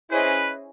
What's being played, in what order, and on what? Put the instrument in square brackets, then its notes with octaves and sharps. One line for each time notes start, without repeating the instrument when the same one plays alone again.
[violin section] C#4 E4 G#4 C5 D#5 [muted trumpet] B4